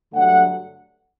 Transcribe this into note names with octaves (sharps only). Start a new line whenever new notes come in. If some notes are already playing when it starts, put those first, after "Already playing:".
G2 D3 F#3 A3 F#5